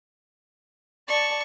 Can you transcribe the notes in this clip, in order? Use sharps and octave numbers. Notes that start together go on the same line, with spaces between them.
D5 A5 C#6